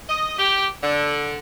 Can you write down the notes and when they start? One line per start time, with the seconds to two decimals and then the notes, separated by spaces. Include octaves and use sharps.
0.09 D#5
0.39 G4
0.83 D3